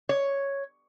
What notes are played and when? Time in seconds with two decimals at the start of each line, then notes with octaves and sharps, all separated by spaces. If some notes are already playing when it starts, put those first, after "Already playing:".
0.09 C#5